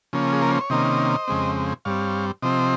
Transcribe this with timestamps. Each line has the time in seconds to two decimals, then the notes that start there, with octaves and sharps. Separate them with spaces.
0.13 C#3 F3 A#3 C#4
0.33 G#4
0.42 A#4
0.51 C5
0.61 C#5
0.70 C3 D#3 A#3 C#4 C5 D#5
1.28 F2 C#3 G#3 C4
1.85 G2 G3 C4 C#5 F5
2.42 C3 F3 C4 C5 D#5